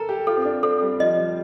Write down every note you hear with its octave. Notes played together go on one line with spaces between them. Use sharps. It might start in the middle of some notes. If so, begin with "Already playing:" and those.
Already playing: A4 A#4 A#5
G4
F4 A4
C4
D4
C4 A4
G3
F3 D#5
G3